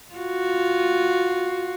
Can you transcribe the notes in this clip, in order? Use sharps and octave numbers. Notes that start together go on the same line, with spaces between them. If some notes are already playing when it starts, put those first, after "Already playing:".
F4 F#4